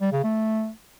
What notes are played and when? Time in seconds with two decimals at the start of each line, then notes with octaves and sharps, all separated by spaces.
0.01 G3
0.12 C#3
0.24 A3